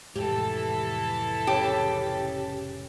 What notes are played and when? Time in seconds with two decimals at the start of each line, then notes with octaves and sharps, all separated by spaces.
0.16 F1 A2 E3 G#3 G4 A4
1.47 C#3 G4